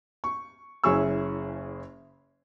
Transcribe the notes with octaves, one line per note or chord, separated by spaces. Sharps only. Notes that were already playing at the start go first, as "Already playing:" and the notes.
C#6
F#1 C#4 E4 G#4 C#6 E6